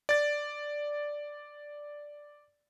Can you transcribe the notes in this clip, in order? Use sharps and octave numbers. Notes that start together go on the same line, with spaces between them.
D5 A6